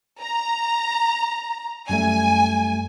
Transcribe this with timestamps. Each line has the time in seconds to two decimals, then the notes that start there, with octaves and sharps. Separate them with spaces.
0.20 A#5
1.89 F#2 G3 A3 G#5